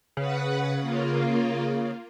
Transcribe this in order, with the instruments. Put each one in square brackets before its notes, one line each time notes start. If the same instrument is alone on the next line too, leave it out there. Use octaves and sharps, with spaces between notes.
[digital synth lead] C#3 [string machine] B4 F#5
[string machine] A#3 F4